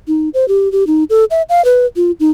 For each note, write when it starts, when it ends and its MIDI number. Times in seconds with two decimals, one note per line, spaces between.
0.08 0.29 63
0.34 0.48 72
0.48 0.71 67
0.72 0.87 67
0.87 1.04 63
1.10 1.25 69
1.31 1.42 76
1.49 1.64 77
1.65 1.86 71
1.96 2.11 65
2.20 2.31 63